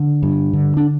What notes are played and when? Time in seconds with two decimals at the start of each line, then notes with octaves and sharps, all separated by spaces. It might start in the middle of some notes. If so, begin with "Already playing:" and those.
Already playing: D3
0.23 G2
0.53 D3
0.77 D4